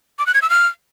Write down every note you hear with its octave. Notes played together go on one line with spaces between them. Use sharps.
D6
F#6
G#6
E6
F6